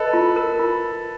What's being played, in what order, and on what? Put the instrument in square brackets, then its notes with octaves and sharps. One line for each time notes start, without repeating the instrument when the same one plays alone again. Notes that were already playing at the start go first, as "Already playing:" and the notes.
Already playing: [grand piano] A4 B4 [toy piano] D#5
[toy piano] F4
A#4
F4